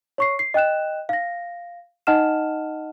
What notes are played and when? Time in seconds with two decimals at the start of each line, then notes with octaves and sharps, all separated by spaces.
0.18 C#5 C#6 C7
0.39 C7
0.54 D#5 G5 F#6 E7
1.09 F5 A#6
2.07 D#4 D#5 F#5 A5 F6 E7